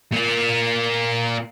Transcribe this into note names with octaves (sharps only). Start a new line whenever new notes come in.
A#2 A#3